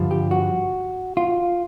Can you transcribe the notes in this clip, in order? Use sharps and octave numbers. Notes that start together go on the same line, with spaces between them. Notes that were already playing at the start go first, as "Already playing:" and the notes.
Already playing: G2 D3 F3
G4
F#4
F4